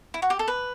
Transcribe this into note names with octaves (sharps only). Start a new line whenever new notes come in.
E4
F#4
G4
A4
B4